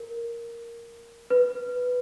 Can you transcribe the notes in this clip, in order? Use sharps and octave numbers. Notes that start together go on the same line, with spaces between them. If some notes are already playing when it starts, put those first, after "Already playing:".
Already playing: A#4
B4